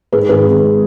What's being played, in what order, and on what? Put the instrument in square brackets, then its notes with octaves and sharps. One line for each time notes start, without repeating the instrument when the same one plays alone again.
[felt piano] G#2 G#4 B4
G#1 G#4 B4
G#1
G#3